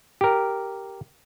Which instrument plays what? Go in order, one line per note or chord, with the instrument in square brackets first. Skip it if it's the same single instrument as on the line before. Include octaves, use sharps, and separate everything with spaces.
[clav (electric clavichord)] G4 A#4